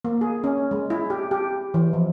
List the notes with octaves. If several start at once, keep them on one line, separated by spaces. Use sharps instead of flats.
A#3
G#4
C#4
G#3
E4
G4
G4
E3
F3